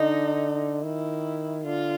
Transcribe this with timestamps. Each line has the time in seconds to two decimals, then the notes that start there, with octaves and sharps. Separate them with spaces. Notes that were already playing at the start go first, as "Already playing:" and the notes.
Already playing: D3 D#4
0.82 D#3 E4
1.64 D3 F4